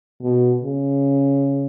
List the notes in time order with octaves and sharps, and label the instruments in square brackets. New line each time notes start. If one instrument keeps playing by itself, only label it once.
[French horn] B2
C#3